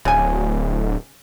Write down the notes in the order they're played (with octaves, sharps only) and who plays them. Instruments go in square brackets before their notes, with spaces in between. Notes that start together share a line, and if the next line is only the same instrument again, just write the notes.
[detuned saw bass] D1 [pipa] C#3 G#5